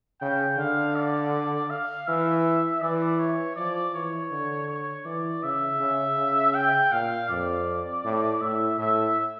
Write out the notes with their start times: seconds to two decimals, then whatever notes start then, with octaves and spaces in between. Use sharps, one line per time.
0.21 C#3 G5
0.58 D3 F5
0.96 D5
1.70 F5
2.08 E3 E5
2.82 E3 D5
3.19 C#5
3.56 F3 D5
3.94 E3 C#5
4.31 D3
4.68 C#5
5.05 E3 D5
5.43 C#3 E5
5.80 C#3
6.18 C#3
6.55 G5
6.92 A#2 F5
7.29 F2 D5
8.04 A2
8.41 A2 E5
8.78 A2 E5